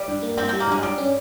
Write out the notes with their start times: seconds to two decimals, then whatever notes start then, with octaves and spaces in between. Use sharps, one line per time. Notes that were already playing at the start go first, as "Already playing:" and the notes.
Already playing: G3
0.08 G2
0.23 A#3
0.37 G2 C4
0.49 G3 C4
0.60 A#3
0.68 G2 G#3
0.83 G2 G3
0.98 C#4